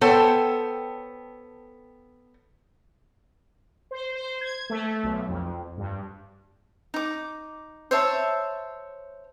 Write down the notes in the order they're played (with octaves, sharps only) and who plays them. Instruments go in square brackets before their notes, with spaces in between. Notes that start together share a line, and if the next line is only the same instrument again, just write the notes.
[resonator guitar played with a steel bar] B3 A4 C5 C#5 G5 A5
[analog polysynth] C5
C5
G#6
A3
B1
F2
G2
[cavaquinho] D#4 D6
C5 C#5 E5 A5